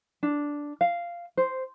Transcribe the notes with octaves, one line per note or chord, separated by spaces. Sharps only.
D4
F5
C5